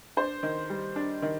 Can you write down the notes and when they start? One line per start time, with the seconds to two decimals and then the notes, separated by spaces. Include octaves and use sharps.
0.17 D4 C5
0.43 D#3
0.70 G3
0.96 D4
1.22 D#3